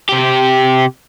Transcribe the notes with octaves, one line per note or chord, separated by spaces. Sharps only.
C3 G4